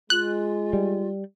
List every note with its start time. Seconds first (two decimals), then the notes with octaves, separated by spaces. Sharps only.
0.10 G#3 F4 F#6
0.73 G3